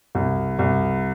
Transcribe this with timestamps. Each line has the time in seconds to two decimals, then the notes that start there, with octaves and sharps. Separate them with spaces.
0.15 C2
0.59 C2